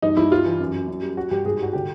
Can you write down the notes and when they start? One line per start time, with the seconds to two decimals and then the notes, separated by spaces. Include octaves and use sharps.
0.02 G2 D#4
0.17 G2 E4
0.31 G3 F4
0.45 E3
0.60 F#2
0.74 F#2
0.88 F#2
1.02 G3
1.17 G3 F#4
1.31 G2 G4
1.45 G#2 G#4
1.59 G3 F#4
1.73 D3 G4